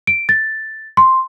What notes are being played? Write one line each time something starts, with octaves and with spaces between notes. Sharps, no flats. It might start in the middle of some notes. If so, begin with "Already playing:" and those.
D7
A6
C6